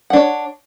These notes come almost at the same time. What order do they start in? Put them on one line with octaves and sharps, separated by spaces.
F#5 D4 C#5